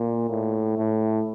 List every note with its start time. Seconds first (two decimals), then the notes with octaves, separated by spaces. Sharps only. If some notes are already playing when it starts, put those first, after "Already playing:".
Already playing: A#2
0.30 A2
0.78 A2